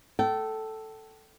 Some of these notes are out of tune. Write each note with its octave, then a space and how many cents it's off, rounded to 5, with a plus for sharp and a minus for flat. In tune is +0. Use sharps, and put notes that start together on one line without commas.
A4 +0 G5 -30